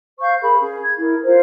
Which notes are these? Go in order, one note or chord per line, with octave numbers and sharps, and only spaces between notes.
C5 F5 C#6 G6
G#4 A#4 B5
C#4 G#4
G#6
E4 A#4
F4 A#4 C5